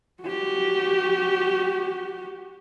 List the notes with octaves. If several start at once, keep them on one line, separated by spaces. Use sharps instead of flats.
F#4 G4